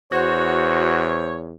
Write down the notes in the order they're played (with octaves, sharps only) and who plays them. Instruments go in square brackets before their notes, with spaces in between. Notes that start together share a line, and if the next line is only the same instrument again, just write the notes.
[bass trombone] E2 [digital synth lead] F#4 [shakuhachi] C5 [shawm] C#5